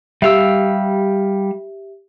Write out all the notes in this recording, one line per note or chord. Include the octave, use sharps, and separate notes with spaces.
G3 G4 E5 F5 E6